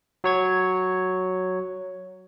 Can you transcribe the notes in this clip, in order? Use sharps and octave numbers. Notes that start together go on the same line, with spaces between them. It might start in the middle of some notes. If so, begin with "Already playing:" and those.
F#3 C#5 G#6